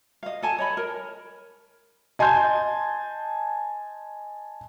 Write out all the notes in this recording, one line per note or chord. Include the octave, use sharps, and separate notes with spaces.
D#5 F5
A4 G#5 A5
C#5 D#5 B5
A#4
D#5 G#5 A5 C6 G6